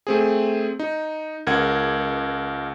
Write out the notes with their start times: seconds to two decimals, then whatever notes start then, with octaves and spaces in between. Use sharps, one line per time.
0.07 A3 C4 G#4
0.79 D#4
1.47 C#2 A#4 F#5 G#6